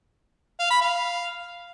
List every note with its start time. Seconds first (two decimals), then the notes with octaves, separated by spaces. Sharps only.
0.59 F5
0.70 B5
0.81 F5